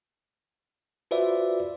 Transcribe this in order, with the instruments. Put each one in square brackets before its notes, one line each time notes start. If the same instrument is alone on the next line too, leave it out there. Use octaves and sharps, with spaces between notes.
[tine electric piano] F4 F#4 B4 C5 D5 E5